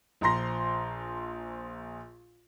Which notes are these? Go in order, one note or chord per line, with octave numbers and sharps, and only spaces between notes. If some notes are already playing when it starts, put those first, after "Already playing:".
A#1 F3 A#5 C6 A#6